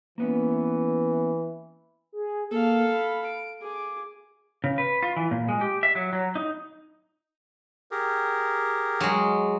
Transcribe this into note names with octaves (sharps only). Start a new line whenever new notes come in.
E3 A#3 B3 C#4
G#4
A#3 A4 F5
B5
D7
G#4 D6
C#3
B4
F4
E3
A#2
G#3
G4
E5
F#3
F#3
D#4
G4 G#4 A#4
F#3 G#3